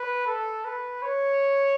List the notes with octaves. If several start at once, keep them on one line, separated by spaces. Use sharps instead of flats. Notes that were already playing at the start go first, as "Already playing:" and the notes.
Already playing: B4
A4
B4
C#5